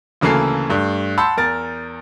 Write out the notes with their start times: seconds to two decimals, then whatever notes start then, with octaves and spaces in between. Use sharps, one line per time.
0.21 D2 C#3 E3 A#3 A4 C7
0.69 G2 A3
1.17 F#5 A5 B5 C6 E6 G6
1.37 E2 A#4 A6